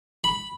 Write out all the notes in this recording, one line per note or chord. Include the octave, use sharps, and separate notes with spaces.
B5